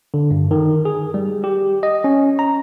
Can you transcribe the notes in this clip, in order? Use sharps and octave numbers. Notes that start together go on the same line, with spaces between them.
D3
G2
D#3
G#4
G3
G4
D#5
C#4
A#5